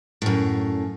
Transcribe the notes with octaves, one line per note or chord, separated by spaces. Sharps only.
F#2 A2